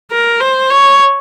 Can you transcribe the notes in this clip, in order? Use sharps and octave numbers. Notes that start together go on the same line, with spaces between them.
A#4
C5
C#5